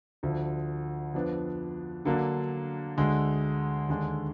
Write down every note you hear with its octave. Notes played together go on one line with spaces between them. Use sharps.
D2 D3 F3
F2 F3 B3 D4
D3 F#3 A#3 D4
D2 D3 G#3
D#2 D3 G#3 D4